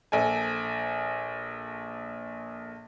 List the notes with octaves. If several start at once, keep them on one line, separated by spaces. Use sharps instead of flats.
A#1 A4 G#5